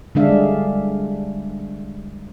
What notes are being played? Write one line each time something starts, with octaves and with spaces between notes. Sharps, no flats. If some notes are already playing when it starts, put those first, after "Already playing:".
D3 G3 G#3 D4 E5 F5